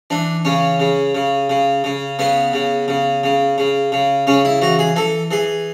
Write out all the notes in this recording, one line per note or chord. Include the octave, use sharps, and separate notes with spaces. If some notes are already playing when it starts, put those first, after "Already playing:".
E3 D4
C#3 C#4
C#3
C#3
C#3
C#3
C#3 B3
C#3
C#3
C#3
C#3
C#3
C#3 C#4
E4
E3 F#4
G#4
E3 A4
E3 G#4